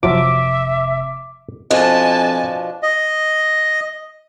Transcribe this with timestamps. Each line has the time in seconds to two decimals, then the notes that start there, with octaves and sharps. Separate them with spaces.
0.03 F1 C3 F3 F#3 F4 E5 D6
1.71 F2 B2 F3 D4 D#5 G#5 A5
2.83 D#5